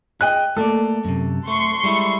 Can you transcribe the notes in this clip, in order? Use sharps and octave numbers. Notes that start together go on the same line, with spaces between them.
G#4 D#5 G5 F#6
A3 A#3 A4 D5
F#2 C3
A3 C6 C#6
G3 G#3 E4